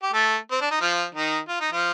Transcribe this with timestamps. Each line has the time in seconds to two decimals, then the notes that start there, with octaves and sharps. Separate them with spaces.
0.03 G4
0.13 A3 A4
0.51 C4
0.61 D4
0.71 D#4
0.80 F3 F4
1.15 D#3 D#4
1.48 F4
1.60 D#4
1.72 F3 F4